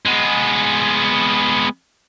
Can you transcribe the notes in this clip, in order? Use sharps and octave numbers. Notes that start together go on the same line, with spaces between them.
G#3 B3